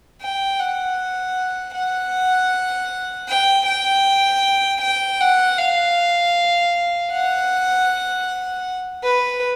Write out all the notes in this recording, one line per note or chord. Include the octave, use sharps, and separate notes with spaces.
G5
F#5
F#5
G5
G5
G5
F#5
F5
F#5
B4